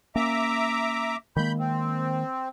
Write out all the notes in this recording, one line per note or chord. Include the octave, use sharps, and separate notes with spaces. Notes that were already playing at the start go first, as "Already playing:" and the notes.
A#3 C#4 E5 A#5 D6
D#3 G#3 A#3 B5 G6
C4